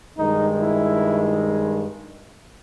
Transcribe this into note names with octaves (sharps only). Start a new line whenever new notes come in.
G2 D#3 G#3 D#4
E4